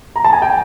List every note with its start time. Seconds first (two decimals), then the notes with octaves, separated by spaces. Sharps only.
0.16 A#5
0.24 A5
0.33 G#5
0.42 G5